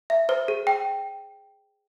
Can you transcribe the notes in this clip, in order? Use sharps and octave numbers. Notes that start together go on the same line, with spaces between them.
E5
C5
G#4
G5